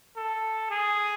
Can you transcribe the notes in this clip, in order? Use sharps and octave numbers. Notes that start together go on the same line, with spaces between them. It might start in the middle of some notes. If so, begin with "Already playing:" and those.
A4
G#4